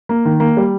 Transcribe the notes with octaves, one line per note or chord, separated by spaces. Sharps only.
A#3
D#3
A#3
G3